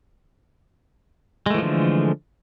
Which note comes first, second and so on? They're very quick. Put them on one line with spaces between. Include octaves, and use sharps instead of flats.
G#3 A3 E3 F3 D3